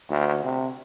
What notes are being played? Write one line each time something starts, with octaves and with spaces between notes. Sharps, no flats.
D2
C3